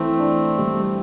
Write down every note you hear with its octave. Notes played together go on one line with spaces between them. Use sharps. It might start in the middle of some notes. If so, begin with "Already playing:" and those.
Already playing: E3 A3 C4
D4
G3